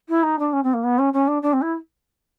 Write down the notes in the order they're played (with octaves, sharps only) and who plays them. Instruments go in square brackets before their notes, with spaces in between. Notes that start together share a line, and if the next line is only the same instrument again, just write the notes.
[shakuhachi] E4
D#4
D4
C#4
C4
A#3
B3
C#4
C#4
D4
D4
C4
E4